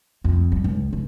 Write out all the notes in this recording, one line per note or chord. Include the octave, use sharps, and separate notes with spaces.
F2
G3
C#2
C#2